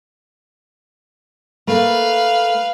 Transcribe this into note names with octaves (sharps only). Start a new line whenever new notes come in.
A3 A#3 B4 F5